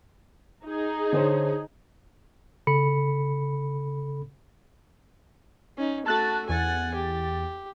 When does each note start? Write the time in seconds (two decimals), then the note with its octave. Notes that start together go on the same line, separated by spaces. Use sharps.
0.64 D#4 G#4
1.13 D3 C5 C#5
2.67 C#3 A4 B5 C#7
5.78 C#4 D#4
6.06 A3 F#4 A5 F#6 A6
6.49 E2 F#5 G#5 A6
6.95 G4